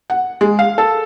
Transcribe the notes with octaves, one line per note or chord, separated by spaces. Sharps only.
F#5
G#3
F5
A4